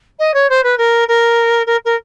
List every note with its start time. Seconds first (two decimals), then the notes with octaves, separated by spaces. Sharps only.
0.19 D#5
0.34 C#5
0.49 C5
0.63 B4
0.77 A#4
1.08 A#4
1.66 A#4
1.85 A#4